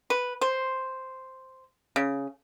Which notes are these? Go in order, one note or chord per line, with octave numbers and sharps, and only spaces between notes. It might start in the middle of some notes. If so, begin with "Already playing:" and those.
B4
C5
C#3